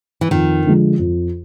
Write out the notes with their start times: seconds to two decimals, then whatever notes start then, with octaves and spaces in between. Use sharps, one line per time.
0.21 E3
0.31 F2 D#3
0.65 D3 F3 G#3
0.99 F2